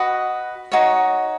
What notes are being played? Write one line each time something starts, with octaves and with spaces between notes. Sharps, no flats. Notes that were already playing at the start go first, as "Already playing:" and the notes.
Already playing: F#4 B4 D#5
D#4 F#4 C#5